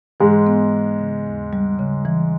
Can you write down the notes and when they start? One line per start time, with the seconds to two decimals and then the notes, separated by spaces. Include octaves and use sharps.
0.20 G#2 E3 G#3
0.47 B3
0.73 E3
0.99 C#3
1.26 D#2
1.53 G3
1.79 C#3
2.05 E3